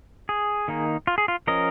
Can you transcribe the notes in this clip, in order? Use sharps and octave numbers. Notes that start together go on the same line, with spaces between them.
G#4
D#3 A#3 D#4
F4
G#4
F4
F3 C#4 A#4 D#5